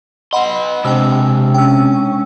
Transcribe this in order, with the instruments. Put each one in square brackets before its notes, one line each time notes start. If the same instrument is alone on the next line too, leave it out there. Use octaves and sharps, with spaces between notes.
[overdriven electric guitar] B3 C6 [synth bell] D#5 F#5 B5
[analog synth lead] C3 [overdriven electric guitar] G#3 D4 [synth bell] G5 E6
[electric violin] C#4 [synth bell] G5 E6